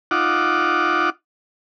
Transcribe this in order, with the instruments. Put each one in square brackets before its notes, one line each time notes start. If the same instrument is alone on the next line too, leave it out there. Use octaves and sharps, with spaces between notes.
[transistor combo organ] D#4 F4 F#5 D6